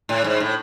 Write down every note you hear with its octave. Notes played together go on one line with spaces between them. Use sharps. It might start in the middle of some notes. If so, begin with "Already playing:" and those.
A2
G#2
A2